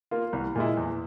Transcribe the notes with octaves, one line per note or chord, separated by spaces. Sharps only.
A#3 F4
C2
A#2 G#3 E4
E2